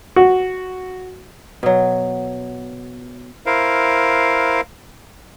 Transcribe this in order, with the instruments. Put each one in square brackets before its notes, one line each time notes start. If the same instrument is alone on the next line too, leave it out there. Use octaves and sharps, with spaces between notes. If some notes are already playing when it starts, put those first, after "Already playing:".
[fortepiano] F#4
[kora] B2 F#3
[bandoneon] E4 A#4 C5 F5